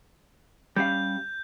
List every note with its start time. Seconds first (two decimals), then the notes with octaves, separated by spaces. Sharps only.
0.76 G3 C#4 F5 G6